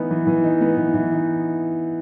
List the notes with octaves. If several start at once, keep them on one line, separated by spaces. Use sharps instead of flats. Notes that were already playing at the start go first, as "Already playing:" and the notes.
Already playing: E3 B3 D#4
E3
E3
D#4
B3
E3
E3
D#4